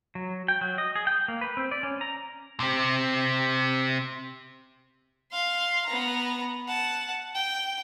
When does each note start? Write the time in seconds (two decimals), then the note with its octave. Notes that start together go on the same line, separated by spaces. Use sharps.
0.15 F#3
0.48 G5
0.61 F#3
0.78 D#5
0.95 G#4
1.07 G5
1.28 A#3
1.41 B4
1.57 C4
1.71 D5
1.83 C#4
2.01 A#5
2.60 C3 C4
5.32 F5 C6
5.86 B3 A#5
6.68 F#5 A5
7.35 G5